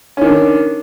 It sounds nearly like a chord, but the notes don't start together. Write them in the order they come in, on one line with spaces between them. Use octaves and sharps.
C#4 D#3 D4